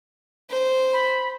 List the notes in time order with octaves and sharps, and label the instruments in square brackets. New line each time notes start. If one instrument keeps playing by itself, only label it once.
[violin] C5
[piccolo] B5